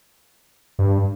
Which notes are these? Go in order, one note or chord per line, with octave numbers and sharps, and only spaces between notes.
G2